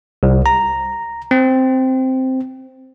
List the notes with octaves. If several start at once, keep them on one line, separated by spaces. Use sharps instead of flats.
C2
A#5
C4